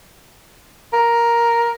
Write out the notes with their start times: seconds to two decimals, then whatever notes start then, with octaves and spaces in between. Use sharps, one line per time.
0.93 A#4